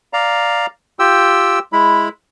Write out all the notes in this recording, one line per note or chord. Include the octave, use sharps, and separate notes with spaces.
D5 F5 A#5
F4 G4 G5 E6
G#3 E4 B5